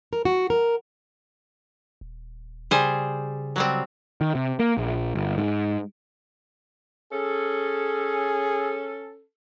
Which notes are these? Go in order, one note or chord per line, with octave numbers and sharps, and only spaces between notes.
A#4
F#4
A#4
D#1
C#3 G3 G#4 C5
F#3 G3 C4
D#3
C3
A#3
A#1
G1
G#2
C#4 G#4 A4